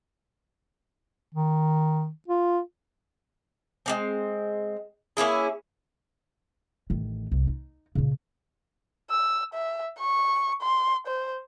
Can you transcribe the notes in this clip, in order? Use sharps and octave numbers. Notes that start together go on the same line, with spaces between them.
D#3
F4
G#3 A#3 C4
A#3 C#4 E4 G#4
A1 D#3
C2
D#4
A#2 C#3
E6
E5
C#6
C6
C5